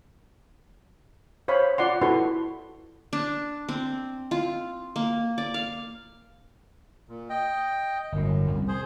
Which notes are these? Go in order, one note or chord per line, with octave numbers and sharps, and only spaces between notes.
C5 C#5 F5 B5
F4 D5 F#5 C6
E4 F#4 A4 B4 C6 C#6
D4
C4
F4
A#3
D5
F5
A#2
D#5 G5
G1 F#2 A2
C2 F2
G#4 C5